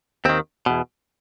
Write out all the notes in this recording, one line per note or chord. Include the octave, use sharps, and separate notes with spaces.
D#2 D#3 C4
E2 B2